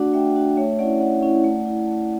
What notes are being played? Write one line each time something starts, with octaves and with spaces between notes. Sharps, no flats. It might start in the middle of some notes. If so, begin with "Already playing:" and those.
Already playing: A3 D4 F#4 D5 F#5
A3 E5 G5
D4 F#4
A3 C#5 E5
C#4 E4 D5 F#5
A3 D5 F#5
C#4 E4
A3
E4
A3